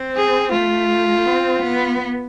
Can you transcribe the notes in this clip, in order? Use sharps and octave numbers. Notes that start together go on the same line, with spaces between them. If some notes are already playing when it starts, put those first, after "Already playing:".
Already playing: C4
G#4
A3 F4
C4
B3